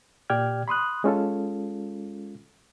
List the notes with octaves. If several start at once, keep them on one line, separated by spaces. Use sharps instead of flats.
A#2 G4 D5 G5 F6 G#6
B5 C6 D#6 F#6
G#3 C#4 F4 A4